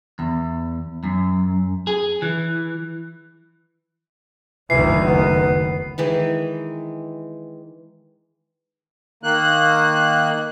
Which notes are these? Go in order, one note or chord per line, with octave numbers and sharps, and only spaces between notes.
E2
F#2
G#4
E3
F#1 D2 D#3 E3 C7
B3
D#3 E3 G#3
D#3 A#3 F#6